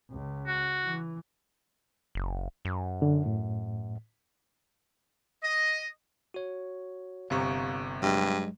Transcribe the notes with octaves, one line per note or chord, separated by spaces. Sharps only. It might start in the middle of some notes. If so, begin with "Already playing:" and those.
C#2
F#4
E3
F#1
F#2
D3
A2
D#5
F#4 C#5
G1 C3 F5 A#5 C#6
G2 F#3 G#3